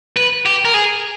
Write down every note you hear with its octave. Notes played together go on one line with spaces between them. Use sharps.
B4
G4
A#4
G#4